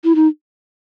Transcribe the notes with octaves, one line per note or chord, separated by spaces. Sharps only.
E4
D#4